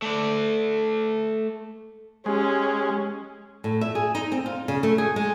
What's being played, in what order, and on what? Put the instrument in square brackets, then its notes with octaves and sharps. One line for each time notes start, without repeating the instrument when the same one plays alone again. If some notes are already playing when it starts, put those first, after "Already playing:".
[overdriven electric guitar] A3 D5
[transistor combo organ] G#3 [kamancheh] C#4 [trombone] G4
[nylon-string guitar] A2
E5
G#4
D#4
C4
F4
C#3
A3
G#4
G#3